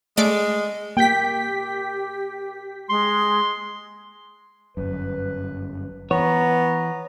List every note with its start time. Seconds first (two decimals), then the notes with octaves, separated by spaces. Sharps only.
0.17 G#3 A3 D5 D7
0.97 A#3 G4 G5 B6
2.89 G#3 C6
4.77 G1 F#2 B4
6.11 E3 B3 C#5 A#5